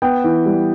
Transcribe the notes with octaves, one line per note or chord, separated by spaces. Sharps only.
B3 G5
E3
G3